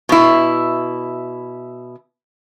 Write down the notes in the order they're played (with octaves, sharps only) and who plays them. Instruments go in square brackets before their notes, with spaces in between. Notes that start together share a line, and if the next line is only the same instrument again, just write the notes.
[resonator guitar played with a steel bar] B2 E4